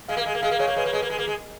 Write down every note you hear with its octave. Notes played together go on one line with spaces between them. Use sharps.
G#3 F5
A#3
G#3
A#3
G#3 F5
A#3
G#3 C#5
A#3
G#3 B4
A#3
G#3
A#3
G#3
A#3
G#3